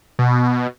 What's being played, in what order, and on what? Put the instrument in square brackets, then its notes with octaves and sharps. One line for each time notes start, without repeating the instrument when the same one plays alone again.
[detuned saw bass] B2